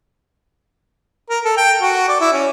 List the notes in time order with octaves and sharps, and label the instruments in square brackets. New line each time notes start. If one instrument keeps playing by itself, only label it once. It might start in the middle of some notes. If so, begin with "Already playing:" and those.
[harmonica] A#4
A4
G5
F#4
D5
E4
C#4